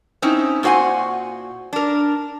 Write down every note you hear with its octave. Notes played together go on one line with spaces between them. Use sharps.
C4 C#4 D#4 E4
A#2 F#4 C5 F#5 G#5
D4 A#4